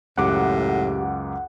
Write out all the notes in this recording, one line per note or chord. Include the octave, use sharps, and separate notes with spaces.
C#2 F#2 A2 G4 F#5 D6